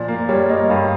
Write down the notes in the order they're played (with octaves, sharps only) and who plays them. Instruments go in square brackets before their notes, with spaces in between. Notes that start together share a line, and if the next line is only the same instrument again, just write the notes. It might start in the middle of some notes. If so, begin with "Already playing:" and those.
Already playing: [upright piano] A#2 F3 [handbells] D5
[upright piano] A#3
[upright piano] G3 [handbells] C#5
[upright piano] A#3 [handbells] D#5
[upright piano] G2 [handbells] F5